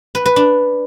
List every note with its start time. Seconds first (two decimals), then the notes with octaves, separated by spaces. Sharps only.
0.15 B4
0.26 B4
0.36 D4